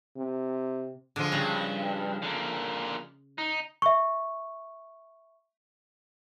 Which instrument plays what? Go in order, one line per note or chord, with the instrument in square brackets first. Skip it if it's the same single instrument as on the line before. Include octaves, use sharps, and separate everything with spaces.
[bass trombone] C3
[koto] D3 [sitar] F3 G#3
[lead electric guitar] G2 [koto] C#3
[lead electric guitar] D3 A#3
D#4
[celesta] E5 C#6